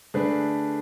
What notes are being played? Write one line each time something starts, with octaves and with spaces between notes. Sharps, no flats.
D3 A3 D4 G#4 B4